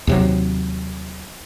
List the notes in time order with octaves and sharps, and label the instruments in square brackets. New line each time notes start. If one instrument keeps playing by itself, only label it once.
[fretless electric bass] D#2 C3 F#3